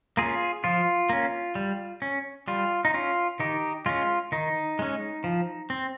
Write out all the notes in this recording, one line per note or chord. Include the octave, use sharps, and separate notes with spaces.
A#3 C#4 F4 G#4
F3 F4
A#3 C#4
G3
C#4
G3 F4
D#4
C#4 F4
D#3 D#4 G4
G#3 C#4 F4
D#3 D#4
G#3 C#4
F3
C4